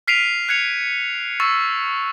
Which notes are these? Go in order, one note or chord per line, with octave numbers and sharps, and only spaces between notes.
F6 B6 C7 D7 D#7 F7
F#6 G#6 C#7 F7
C#6 E6 A6